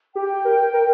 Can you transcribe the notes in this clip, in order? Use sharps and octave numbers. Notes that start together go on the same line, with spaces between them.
G4 G5
A#4
A#4